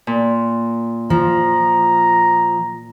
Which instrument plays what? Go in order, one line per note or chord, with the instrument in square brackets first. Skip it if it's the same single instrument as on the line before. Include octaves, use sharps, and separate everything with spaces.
[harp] A#2
[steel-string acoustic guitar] F3 [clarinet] A#5